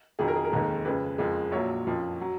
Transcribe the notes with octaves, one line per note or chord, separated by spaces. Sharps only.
F2 D#3 F#3 G#4
A#4
G#4
A#4
F1 D#2 D#3 G#3
F2 C#3 G#3 B4
F#1 F2 F3 G#3
A#1 A#2 F#3 C#5
F#1 F2 F3
F#3